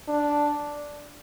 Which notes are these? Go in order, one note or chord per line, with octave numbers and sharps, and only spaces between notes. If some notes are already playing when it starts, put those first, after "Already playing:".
D4